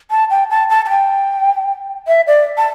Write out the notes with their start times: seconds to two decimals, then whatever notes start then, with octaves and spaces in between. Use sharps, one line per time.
0.11 A5
0.30 G5
0.50 A5
0.70 A5
0.85 A5
0.89 G5
2.07 E5
2.27 D5
2.57 A5